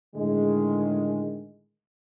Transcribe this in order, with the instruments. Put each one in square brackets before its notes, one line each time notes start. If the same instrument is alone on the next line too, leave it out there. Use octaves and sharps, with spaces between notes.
[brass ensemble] A2 D3 D#3 G#3